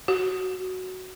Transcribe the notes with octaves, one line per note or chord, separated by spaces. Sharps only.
F#4